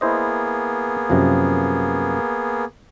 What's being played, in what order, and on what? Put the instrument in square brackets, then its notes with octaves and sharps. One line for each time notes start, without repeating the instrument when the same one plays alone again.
[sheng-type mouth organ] A#3 B3 G#4 [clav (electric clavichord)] E4 C5 D#5
[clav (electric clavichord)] F#2 C3 F3